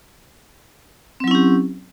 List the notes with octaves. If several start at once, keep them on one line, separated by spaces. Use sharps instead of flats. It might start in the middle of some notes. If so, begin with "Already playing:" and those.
F#3 C4 C#4 E4 G4